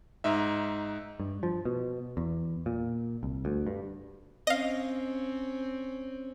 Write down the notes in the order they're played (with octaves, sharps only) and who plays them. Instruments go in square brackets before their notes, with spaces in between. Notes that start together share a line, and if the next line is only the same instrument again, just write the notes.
[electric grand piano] G#2 D#4 E5
[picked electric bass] G2
F3
B2
E2
A#2
C2
D2
G2
[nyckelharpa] C4 C#4 [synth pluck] D#5 F5